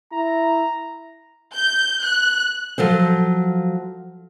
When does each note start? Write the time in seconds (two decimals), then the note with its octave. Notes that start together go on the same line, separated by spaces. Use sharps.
0.12 E4 A#5
1.56 G6
2.03 F#6
2.78 F3 F#3 A4 C5